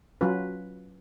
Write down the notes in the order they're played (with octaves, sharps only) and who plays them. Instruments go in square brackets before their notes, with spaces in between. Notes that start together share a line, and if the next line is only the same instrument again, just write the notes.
[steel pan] F#3 C#4 F4 B4